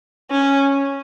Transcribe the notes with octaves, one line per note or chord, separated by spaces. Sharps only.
C#4